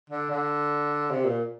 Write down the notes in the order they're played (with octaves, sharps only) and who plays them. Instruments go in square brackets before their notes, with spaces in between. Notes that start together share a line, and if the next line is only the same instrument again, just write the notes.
[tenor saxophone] D3
D3
C3
A#2